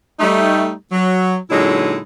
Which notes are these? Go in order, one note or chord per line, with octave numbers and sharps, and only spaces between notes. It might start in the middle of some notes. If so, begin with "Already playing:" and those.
G3 A3 D#4
F#3
A#2 D3 F#3 G#3 D#4 E4